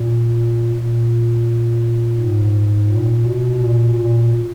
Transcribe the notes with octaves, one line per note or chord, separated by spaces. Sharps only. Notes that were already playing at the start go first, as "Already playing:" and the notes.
Already playing: A#2
A#2
G#2
A#2
B2
A#2
A#2